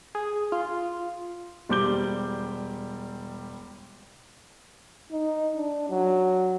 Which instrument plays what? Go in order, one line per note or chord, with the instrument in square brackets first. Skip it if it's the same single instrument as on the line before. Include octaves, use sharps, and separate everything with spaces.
[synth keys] G#4
F4
[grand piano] E1 G3 C5 D6 G6 G7
[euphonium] D#4
D4
F#3